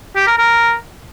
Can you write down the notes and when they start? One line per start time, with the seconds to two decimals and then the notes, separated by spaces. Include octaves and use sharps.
0.16 G4
0.27 A#4
0.38 A#4